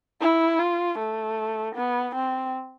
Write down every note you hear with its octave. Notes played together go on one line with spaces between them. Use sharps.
E4
F4
A3
B3
C4